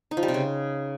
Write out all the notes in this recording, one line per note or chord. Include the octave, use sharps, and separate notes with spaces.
D#4
F3
G3
C3
C#3